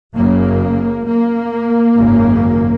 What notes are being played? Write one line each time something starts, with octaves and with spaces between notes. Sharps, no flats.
F#1 F#2 C#3 A#3
A#3
G#1 F#2 C#3